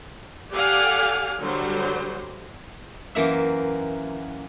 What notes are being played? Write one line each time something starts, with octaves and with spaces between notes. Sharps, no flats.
G4 A4 D5 F5 F#5 G#5
D3 F#3 G3 C5
F#2 E3 A#3 E5